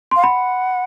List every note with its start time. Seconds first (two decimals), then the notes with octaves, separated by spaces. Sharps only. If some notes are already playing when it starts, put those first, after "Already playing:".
0.11 F5 C6
0.23 F#5 B5